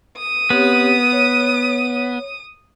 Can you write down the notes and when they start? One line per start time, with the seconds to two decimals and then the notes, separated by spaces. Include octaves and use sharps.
0.18 D#6
0.50 B3 C4 G4 C#5
1.12 C#5